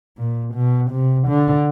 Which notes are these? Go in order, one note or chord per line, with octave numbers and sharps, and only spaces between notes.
A#2
B2
C3
D3